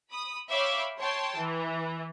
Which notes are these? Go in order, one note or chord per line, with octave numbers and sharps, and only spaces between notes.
B5 D#6
C#5 E5 F5 G5 B5 D6
C#5 G5 A5 C6
E3